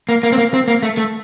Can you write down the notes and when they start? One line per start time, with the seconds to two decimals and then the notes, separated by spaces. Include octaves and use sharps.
0.09 A#3
0.23 A#3
0.32 C4
0.38 A#3
0.54 C4
0.68 A#3
0.82 A3
0.97 A3